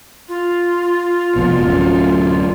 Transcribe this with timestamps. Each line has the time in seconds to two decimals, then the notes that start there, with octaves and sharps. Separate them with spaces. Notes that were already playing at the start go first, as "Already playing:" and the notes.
0.29 F4
1.36 F1 F2 B2
1.63 D1 F#2